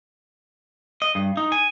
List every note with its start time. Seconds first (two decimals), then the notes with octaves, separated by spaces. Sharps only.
1.02 D#5
1.15 G2
1.37 D#4
1.52 G#5